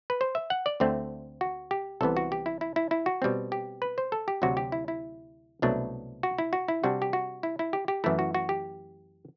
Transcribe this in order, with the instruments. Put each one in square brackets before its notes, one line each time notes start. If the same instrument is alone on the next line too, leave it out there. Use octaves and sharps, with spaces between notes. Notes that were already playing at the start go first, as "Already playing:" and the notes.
[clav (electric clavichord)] B4
C5
E5
F#5
D5
D2 D3 A3 C4
F#4
G4
C2 C3 E3 B3 A4
F#4
G4
E4
E4
E4
E4
F#4
B2 G3 C4
G4
B4
C5
A4
G4
D2 C3 F#3 F#4
G4
E4
E4
C2 B2 F#3 A3 D4
F#4
E4
F#4
E4
C3 G3 D4 F#4
G4
F#4
E4
E4
G4
G4
F#2 E3 A3 E4
F#4
F#4
G4